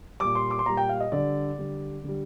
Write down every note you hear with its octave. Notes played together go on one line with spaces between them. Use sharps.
A#2 G3 D6
C6
D6
C6
A#2 G3 A#5
G5
F5
D#5
D3 G3 D5
D3 G3
D3 G3